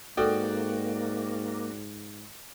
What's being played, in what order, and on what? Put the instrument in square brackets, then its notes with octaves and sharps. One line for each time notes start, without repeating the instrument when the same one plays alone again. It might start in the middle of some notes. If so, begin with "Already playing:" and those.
[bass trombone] G#2 [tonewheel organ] A#3 [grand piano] F#4 D5 G5 [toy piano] A4 B4